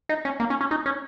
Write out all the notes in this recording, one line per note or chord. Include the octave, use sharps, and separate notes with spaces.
D#4
C#4
A#3
C#4
C#4
D#4
C#4